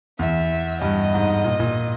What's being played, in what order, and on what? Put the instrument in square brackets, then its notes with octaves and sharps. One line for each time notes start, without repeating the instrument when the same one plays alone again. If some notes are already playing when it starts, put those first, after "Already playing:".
[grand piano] E2 [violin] E5
[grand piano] G2 [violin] D#5
[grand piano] G#2
A#2
A#2